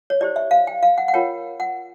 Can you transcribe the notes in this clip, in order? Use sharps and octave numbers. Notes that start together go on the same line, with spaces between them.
C#5
E4 G4 C5 D5
E5
F5
G5
F5
F#5
F#5
F4 A#4 C#5 G5
F#5